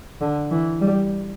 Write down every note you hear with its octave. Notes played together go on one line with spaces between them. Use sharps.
D3
E3
G3